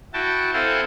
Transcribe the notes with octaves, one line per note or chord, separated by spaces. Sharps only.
E4 F#4 G5 A5
C4 E4 A4 F5 F#5 G#5